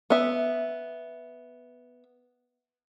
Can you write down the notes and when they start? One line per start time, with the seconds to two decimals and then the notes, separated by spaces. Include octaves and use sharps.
0.10 B3 E5